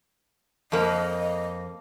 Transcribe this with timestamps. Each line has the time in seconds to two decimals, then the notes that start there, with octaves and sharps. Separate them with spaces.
0.72 F2 A#3 D#5